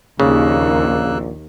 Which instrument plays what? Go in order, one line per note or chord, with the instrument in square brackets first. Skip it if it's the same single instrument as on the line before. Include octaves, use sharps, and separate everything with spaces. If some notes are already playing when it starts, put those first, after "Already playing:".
[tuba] A#1 [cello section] D#2 [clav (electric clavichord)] C#3 [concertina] A#3 E6 F#6